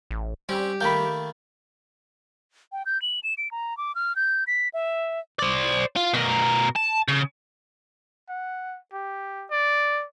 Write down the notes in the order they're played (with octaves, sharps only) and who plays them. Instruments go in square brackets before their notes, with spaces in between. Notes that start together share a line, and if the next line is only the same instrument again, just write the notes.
[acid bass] A1
[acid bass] G3 [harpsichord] C4 C#4 [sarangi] G4
[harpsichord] D#3 A3 A#3 [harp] G5 B5
[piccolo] G5
G6
F#7
E7
D7
A#5
D6
F6
G6
B6
E5
[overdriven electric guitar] C5 D5
F4
B2 A#4
A5
C#3
[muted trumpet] F#5
G4
D5